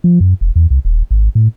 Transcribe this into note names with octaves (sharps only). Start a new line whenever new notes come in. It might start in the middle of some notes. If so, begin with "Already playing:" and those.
F3
F#2
E1
E2
C2
D#1
G#1
A2